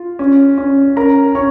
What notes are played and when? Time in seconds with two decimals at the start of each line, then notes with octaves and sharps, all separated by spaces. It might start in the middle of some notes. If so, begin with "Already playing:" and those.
Already playing: F4
0.19 C#4
0.58 C#4
0.96 C#4 A#4 A#5
1.35 C#4 C#5 C#6